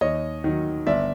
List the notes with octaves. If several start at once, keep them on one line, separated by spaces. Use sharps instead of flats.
D#2 C#5 D#5
D#3 F#3
G1 D5 E5